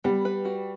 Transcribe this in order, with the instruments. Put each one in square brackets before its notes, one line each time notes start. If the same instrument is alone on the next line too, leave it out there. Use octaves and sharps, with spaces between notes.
[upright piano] G3 [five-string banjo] B3
[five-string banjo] B4
F#4